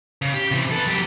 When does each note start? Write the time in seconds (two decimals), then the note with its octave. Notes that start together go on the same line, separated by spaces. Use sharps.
0.22 C#3
0.34 G4
0.51 C3 E3
0.71 A4 B4
0.87 F#3 G4